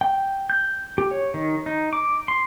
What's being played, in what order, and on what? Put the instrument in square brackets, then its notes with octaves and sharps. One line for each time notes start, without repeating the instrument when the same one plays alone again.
[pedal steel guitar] G5
G6
G4
C#5
D#3
D#4
D6
C6